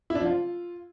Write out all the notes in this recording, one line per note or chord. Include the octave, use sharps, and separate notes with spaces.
E4
D4
F3
F4